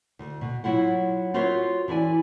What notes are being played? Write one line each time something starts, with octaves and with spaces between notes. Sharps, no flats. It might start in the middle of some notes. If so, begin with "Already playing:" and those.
D2
B2
F#3 E4 F4 F#5
F4 F#4 A#4 C5 C#5 E5
E3 E4 D5 G#5